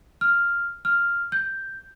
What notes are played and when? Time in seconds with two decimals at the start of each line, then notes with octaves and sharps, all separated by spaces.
0.21 F6
0.85 F6
1.32 G6